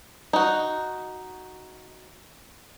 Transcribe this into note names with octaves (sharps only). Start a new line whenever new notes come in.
D#4 F#4